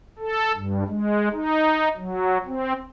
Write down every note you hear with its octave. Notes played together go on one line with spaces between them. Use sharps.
A4
G2
G#3
D#4
F#3
C4